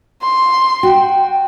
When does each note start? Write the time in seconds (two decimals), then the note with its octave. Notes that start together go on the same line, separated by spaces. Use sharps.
0.22 C6
0.83 F#4 G5